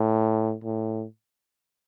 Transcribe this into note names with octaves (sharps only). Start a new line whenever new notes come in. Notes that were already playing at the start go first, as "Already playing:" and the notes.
Already playing: A2
A2